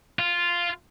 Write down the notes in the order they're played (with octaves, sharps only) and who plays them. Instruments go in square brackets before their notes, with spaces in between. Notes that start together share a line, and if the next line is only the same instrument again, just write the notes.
[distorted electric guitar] F4